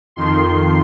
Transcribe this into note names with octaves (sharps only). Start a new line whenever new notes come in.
F2 D#3 C6